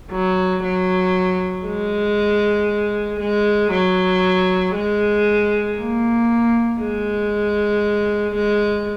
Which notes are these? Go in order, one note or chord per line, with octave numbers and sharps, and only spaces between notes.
F#3
F#3
G#3
G#3
F#3
G#3
A#3
G#3
G#3